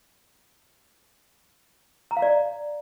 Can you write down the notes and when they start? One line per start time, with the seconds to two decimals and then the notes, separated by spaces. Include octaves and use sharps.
2.11 A#5
2.17 F5
2.22 D5